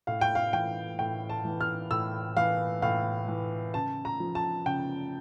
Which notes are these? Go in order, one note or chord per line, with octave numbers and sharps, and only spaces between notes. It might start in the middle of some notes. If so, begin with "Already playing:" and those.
A2 F5
G5
F5
E3 G5
A2 G5
A5
E3
F6
A2 E6
E3 F5
A2 F5
E3
C#3 A5
A#5
F3
A5
C#3 G5